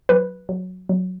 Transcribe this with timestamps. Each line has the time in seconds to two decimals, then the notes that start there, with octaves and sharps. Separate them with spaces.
0.09 F#3 B4
0.49 F#3
0.89 F#3